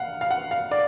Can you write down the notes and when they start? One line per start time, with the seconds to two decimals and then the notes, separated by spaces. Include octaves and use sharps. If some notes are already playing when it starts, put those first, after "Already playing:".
Already playing: F5 F#5
0.21 F5
0.31 F#5
0.51 F5
0.71 D5